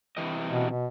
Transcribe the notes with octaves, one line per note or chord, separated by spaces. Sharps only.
C3 E3 D#5
B2
B2